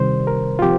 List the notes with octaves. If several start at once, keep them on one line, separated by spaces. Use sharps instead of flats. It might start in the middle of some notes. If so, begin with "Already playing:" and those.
Already playing: C3 D#3 G3 C5
A#4
F4
F3 C4 G4